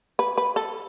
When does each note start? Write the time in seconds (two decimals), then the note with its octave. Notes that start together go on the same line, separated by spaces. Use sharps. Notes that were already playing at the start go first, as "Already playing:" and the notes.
0.19 B4
0.38 B4
0.56 A4